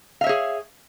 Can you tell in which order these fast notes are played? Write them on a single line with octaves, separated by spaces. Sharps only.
F5 E5 C#5 G#4